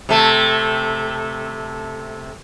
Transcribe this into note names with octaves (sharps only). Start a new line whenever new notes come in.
C3 A3